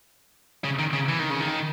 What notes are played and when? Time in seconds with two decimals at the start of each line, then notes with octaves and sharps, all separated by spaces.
0.64 C#3
0.79 D#3
0.93 C#3
1.09 E3
1.19 D#3
1.30 C#3
1.41 D#3